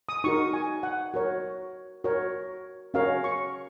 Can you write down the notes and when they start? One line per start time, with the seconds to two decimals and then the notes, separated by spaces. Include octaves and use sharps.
0.09 D#6
0.24 D#4 F#4 A#4 C#6
0.53 G#5
0.83 F#5
1.14 F#4 A#4 C#5
2.04 F#4 A#4 C#5
2.94 C#4 F#4 A#4 C#5 F5
3.24 C#6